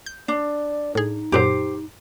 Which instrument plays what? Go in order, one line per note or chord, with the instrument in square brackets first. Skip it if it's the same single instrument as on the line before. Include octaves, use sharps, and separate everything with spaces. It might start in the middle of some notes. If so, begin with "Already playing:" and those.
[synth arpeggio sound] G6
[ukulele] D4 [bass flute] D5
[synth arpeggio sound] A2 G#4 [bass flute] D#4
[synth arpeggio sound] F#2 A#2 F#3 [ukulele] G4 C5